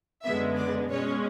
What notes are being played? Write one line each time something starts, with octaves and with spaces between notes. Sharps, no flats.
F#2 D3 G#3 B3 E5
D5
B2 G#3 C#4 C#5